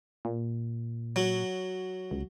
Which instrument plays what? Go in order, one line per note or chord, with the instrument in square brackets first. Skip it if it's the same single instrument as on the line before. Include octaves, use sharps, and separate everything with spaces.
[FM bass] A#2
[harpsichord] F#3
[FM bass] C#2